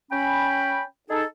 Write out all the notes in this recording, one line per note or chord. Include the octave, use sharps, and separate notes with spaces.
C#4 G5 B5
D#4 G#4 A4